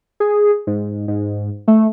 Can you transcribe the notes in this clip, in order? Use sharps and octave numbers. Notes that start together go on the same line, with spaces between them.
G#4
G#2
G#2
A3